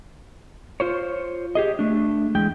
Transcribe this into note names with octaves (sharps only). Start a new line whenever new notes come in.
F4 C5 C#5
G4 G#4 D#5
A3 D4
E2 G#3 G5